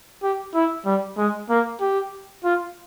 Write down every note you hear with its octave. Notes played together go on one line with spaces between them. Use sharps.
G4
E4
G3
G#3
A#3
G4
F4